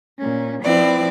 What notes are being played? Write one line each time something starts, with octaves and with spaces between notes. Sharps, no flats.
A#2 C#4
F3 C4 E4 B4 D5